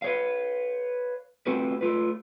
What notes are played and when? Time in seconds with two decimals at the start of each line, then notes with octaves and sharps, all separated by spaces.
0.02 B4 C#5 F5
1.47 A3 C4 F4 F#4 B4
1.81 A3 F4 B4